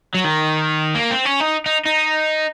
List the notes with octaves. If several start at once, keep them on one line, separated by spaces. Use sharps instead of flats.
F#3
D#3
A#3
C4
C#4
D#4
D#4
D#4